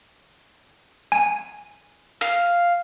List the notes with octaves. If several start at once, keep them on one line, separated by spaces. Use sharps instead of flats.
G#5
F5